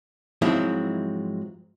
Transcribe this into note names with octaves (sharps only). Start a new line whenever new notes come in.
G#2 F3 F#3 G#3 C4 E4